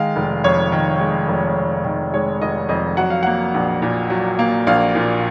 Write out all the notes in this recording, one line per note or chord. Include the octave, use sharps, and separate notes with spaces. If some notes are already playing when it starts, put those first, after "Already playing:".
Already playing: D#3 G#3 F5
F1
F2 C#5
D#3
G#3
F1
F2
D#3
G#3 C#5
F1 D#5
F2 D#5
F#3 F#5
F5
A#3 F#5
A#1
A#2
F#3
A#3
A#1 F5
A#2